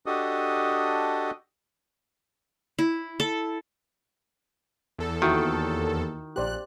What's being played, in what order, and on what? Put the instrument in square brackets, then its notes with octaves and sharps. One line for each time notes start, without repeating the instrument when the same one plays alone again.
[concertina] D4 F#4 G4 A4 D#5 D#6
[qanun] E4
A4
[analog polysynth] E2 A4
[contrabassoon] D#2 [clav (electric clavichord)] D#3 [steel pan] E4 F#4
[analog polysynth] A#1 F#6 [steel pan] G4 C5 D5